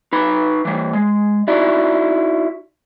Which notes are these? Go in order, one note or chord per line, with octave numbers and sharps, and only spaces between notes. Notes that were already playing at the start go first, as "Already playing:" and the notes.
D#4 B4 B5
E3 G3
G#3
D#4 E4 F#4 D5